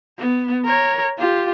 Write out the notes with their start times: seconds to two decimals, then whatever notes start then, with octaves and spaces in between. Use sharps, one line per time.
0.19 B3
0.65 A#4 C#5
1.19 F4 G4